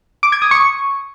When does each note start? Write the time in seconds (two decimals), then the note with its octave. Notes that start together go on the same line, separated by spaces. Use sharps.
0.23 D6
0.32 G#6
0.42 D#6
0.51 C#6